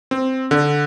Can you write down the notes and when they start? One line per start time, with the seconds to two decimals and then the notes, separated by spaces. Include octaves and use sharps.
0.11 C4
0.51 D3